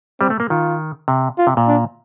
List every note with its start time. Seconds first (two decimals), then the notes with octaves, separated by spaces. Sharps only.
0.21 G3 C4
0.30 A3
0.40 A#3
0.50 D#3 F4
1.08 C3
1.38 F4
1.47 C3
1.57 A#2
1.68 D4